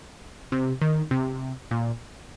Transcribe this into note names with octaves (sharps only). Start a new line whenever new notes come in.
C3
D#3
C3
A#2